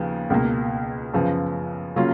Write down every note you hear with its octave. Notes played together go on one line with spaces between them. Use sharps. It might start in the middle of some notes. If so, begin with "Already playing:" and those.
Already playing: D#2 C#3 F3 B3
C#2 B2 A#3
F#2 C#3 F3 B3
C#3 F#3 A#3 C#4 F4